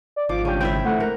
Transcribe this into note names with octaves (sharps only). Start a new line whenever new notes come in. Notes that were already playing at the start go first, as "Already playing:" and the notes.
D5
G#1 F3 D6
C2 C#3 C#4 D4 G4
G#1 C4 E4 E5 G5
D2 A2 E3 A3 F#5
A#4